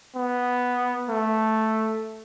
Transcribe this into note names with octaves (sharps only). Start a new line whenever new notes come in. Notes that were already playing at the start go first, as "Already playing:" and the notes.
B3
A3